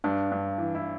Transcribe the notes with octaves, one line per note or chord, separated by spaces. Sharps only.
G2 D4
G2
E3
E4